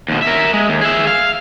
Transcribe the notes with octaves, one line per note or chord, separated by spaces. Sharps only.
D#2 B2
A#4 E5
G#3
D#2
G#4 E5
F5